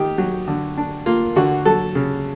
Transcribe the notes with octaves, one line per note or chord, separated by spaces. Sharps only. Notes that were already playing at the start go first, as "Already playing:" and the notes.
Already playing: D#3 G4
F#3
D3
D4
A#3 F4
D3 F#4
F#3 A4
C#3